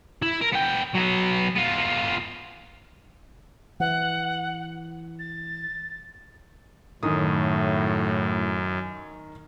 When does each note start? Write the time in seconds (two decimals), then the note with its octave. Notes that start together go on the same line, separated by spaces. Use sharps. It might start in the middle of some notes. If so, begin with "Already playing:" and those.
0.23 E4
0.42 A#4
0.53 B3 G5
0.94 F#3 B3
1.56 B3 F4
3.80 E3 F#5
5.19 A6
7.03 F#2 A2 D#3 D#6